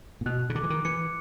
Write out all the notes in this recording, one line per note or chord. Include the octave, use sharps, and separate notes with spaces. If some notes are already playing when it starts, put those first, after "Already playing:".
A#2
B2 F#6
C#3
D3 D6
E3
D#3
E3 C#7